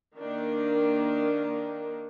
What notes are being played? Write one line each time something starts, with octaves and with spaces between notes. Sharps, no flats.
D#3 A#3 D4